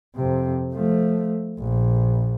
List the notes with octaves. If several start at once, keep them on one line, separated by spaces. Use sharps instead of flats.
F2 C3
F3 A3
A#1